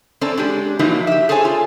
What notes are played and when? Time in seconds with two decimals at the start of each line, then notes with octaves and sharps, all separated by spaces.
0.21 C4 C#4 A4 D5
0.37 G#3 D4 G4
0.79 F3 F#3 A#3 D#4 E4
1.07 G4 E5
1.29 G#4 A4 C5 C#5 G#5
1.45 F4